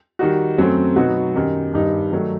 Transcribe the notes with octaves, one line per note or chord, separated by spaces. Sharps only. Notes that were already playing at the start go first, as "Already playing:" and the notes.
D#3 G3 D#4 F#4
F#2 F#3 A3 C4
B2 F#3 B3 D#4 F#4
F#2 D#3 G3
G2 D#3 G3 D#4
D#3 F#3 A3